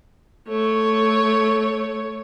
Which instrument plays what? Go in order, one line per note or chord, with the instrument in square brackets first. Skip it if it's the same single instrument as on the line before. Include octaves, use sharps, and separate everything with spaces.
[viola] A3 C#5